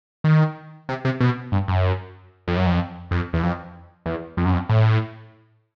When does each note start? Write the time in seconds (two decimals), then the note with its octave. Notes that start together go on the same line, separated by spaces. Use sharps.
0.24 D#3
0.89 C3
1.05 C3
1.20 B2
1.52 G2
1.68 F#2
2.48 F2
2.57 F#2
2.66 F2
3.11 F2
3.33 E2
3.43 F2
4.06 E2
4.37 F2
4.45 F#2
4.53 F2
4.69 A2